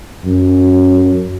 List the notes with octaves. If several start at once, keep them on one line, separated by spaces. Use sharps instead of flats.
F#2